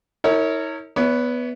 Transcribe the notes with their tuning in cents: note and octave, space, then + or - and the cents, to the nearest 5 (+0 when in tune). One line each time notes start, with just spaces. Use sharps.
E4 -45 A#4 -25 C#5 +0
B3 +0 C#5 +35 E5 -25